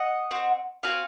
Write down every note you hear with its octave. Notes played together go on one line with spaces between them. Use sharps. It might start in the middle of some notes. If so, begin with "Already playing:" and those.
Already playing: D#5 F#5
C4 F#4
C4 F#4 F5 G#5